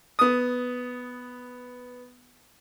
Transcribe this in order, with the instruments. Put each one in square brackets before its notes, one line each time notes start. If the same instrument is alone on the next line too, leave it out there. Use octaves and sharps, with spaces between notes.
[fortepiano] B3 D#6